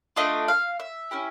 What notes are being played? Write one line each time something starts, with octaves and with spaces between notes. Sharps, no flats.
A3 D4 F4 D#5
F5
E5
C#4 E4 G4